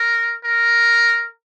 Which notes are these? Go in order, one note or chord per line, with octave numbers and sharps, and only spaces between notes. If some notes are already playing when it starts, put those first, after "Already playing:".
Already playing: A#4
A#4